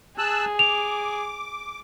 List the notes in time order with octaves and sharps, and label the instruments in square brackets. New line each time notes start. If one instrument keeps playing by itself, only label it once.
[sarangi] G#4 [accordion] A5 E6 F#6
[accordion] D6 [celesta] F7